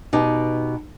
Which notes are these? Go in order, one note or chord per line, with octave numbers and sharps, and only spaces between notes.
B2 D#4 G4